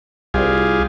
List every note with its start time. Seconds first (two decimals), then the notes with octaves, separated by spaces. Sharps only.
0.34 C2 G3 F4 G#4